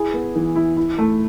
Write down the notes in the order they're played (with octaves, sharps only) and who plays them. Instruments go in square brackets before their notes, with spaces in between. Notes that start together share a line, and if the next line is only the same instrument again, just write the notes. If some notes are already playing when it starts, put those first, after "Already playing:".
Already playing: [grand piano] E4 G#4
B3
E3
E4
E4
A3